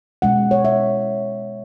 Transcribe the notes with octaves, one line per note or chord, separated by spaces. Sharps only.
B2 G#3 C#4 F#5
C#5
E5